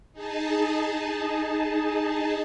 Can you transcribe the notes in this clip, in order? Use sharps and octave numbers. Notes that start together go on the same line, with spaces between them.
D#4 G#4 A5